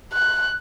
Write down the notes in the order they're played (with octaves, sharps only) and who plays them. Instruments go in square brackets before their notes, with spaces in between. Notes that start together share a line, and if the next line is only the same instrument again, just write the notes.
[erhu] F#6